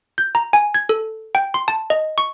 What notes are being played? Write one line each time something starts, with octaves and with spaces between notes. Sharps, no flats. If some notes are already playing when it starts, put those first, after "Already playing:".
G6
A#5
G#5
G#6
A4
G5
C6
A5
D#5
C#6